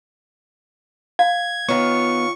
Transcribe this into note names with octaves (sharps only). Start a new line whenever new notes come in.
F5 G#6
D#3 B3 F4 C#5 C#6